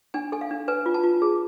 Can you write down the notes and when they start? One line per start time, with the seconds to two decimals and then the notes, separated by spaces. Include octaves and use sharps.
0.14 D4 G#5
0.32 A4 G#5
0.41 F5
0.51 D4
0.68 B4 G#5
0.86 F4
0.94 A5
1.03 F4
1.22 G#4